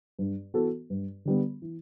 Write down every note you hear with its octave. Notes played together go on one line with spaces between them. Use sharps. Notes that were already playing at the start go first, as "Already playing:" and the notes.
G2
E3 B3 F#4 A4
G2
D3 G3 B3
E3